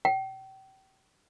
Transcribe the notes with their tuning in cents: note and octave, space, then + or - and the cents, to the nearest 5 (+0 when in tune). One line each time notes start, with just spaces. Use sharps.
G5 -35